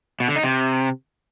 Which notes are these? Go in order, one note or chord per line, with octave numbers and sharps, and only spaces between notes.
B2
D3
D#4
C3